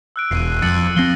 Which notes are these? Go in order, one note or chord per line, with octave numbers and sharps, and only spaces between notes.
E6 F#6 D7
E1 C7 D7 D#7
F2 A6 C#7 F#7
F3 C4 A#6 C7 G7